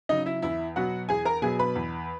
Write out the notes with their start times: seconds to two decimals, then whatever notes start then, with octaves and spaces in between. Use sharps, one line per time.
0.09 C#3 F#3 D#4 D#5
0.26 E4 E5
0.42 E2 E4 E5
0.76 B2 F#3 B3 F#4 F#5
1.09 E2 G#4 G#5
1.25 A#4 A#5
1.42 B2 F#3 B3 G#4 G#5
1.59 B4 B5
1.75 E2